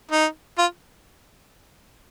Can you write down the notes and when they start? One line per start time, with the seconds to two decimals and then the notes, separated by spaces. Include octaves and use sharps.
0.11 D#4
0.58 F4